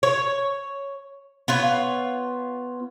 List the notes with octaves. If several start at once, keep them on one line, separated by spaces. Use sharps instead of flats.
C#5
B3 F4 C#5